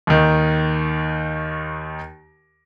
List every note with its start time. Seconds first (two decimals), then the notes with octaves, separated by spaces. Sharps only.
0.07 D#2 D#3